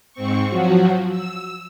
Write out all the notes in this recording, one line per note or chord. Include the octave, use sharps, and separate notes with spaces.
G#2 C4 C#6
F3 F#3 F#4
E6